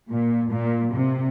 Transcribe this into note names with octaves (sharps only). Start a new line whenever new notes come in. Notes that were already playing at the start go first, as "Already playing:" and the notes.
A#2
A#2
C3